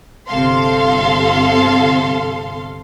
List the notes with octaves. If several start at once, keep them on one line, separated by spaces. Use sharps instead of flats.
G1 C3 A4 F5 C6